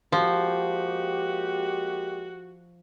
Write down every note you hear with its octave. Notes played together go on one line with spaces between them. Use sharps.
F3 G#3 A#3 F#4 G4